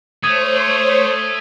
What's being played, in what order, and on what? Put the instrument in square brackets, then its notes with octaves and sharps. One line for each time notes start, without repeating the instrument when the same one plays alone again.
[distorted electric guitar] A3 [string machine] C5 C#5 [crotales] D#6 G#6 D#7